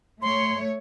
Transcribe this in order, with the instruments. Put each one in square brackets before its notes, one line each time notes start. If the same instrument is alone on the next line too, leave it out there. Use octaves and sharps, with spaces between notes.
[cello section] A3 C#5 [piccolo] C6